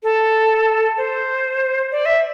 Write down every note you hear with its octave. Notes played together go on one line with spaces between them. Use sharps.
A4
C5
D5
E5